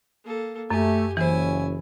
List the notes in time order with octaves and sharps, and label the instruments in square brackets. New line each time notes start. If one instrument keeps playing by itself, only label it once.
[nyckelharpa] A#3 A4
[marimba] F#2 [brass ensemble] A3 [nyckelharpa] G4 G#5
[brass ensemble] F#1 C#4 [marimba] E3 C5 [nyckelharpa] E4 G#5